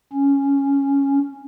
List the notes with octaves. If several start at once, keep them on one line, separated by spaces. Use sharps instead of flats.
C#4